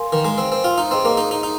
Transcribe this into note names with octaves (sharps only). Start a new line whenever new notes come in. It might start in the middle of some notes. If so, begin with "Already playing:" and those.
Already playing: A#4 F5 G#5 C6
D#3
G#3
C4
C4
F4
D#4
C4 G#4 D#5 C6
A#3
D#4
D#4
D#4